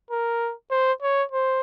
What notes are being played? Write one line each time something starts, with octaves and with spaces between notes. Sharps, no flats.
A#4
C5
C#5
C5